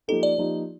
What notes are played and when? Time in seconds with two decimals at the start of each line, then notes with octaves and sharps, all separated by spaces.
0.08 F3 A#3 D#4 G4 A4
0.23 D5
0.38 F3 A#3 D#4 G4